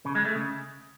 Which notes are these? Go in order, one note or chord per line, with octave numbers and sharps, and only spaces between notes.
C#3
G#3
A3
C#3